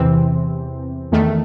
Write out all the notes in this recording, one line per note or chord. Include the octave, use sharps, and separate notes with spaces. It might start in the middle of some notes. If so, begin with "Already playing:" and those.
Already playing: E2 C3 E3 C4
E2 D#3 A3